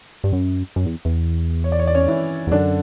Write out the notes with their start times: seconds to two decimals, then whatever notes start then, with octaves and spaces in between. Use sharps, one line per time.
0.24 G2
0.32 F#2
0.76 F#2
0.86 E2
1.05 E2
1.64 C#5
1.72 D5
1.79 C#5
1.87 D5
1.94 C#4 C#5
2.08 E3 E4
2.47 E2
2.51 F#2 D3 D4